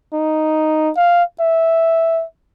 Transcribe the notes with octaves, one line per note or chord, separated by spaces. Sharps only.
D#4
F5
E5